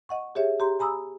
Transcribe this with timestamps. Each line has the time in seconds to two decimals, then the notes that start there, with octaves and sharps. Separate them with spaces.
0.09 D#5 F#5 C#6
0.35 G4 G#4 C#5 E5
0.60 G4 A#5 C6
0.79 G#5 A#5 B5 D#6 E6